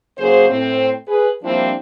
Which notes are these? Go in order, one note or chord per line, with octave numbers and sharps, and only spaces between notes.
C#3 F#3 A#3 G#4 C5
A2 C4
G#4 B4
F3 G3 A#3 C4 D4 E4